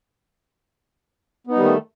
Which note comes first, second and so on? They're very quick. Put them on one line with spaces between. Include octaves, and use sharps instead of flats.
B3 D#4 G3 D#3 A3